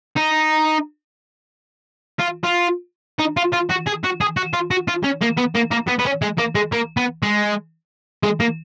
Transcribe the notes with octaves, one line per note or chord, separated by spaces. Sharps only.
D#4
F4
F4
D#4
F4
F4
F#4
G#4
F#4
G#4
F#4
F4
F#4
F4
C#4
A#3
B3
A#3
A#3
B3
B3
C#4
G#3
A#3
G#3
A#3
B3
G#3
G#3
A#3